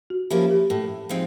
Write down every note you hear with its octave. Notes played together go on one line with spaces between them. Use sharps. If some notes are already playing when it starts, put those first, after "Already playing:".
F#4
F3 A#3 C#4 E4 G4
G4
A2
F3 G#3 C4 D#4